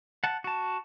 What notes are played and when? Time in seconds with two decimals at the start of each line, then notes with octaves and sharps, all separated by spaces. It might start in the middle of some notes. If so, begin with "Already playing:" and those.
0.24 F#5 A5
0.44 F#4 A5